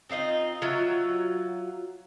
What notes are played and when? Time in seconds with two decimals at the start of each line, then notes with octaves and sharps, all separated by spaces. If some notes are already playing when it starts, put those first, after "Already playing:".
0.10 C4 D#4 F4 D#5
0.62 F#3 F4 E5